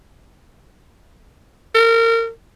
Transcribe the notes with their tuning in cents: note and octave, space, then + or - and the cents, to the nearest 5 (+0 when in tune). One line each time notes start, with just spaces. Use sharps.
A#4 -30